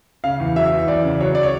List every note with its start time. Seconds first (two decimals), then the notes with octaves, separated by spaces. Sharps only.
0.24 C#3 F5
0.40 E2
0.56 F#3 E5
0.72 E2
0.87 E2 D5
1.04 C#3
1.20 F#3 C#5
1.35 D5
1.43 C#5